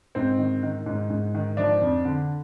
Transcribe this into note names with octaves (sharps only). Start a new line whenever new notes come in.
G#2 C4
D#3
D#3
G#2
G#2
D#3
F3 D4
F2
D3